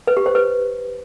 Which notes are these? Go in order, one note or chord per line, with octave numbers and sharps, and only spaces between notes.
B4
G4
C5
B4